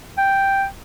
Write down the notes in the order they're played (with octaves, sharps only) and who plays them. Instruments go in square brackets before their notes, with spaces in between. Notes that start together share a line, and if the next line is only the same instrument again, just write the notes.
[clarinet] G5